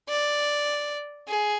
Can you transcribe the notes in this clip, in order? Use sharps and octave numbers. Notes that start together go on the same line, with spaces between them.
D5
G#4